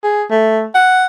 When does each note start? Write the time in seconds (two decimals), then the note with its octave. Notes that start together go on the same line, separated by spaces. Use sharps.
0.04 G#4
0.31 A3
0.75 F#5